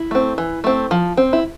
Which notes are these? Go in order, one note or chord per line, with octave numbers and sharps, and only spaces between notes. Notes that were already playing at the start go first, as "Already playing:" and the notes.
Already playing: E4
A3 C4
E3
A3 C4
F3
C4
E4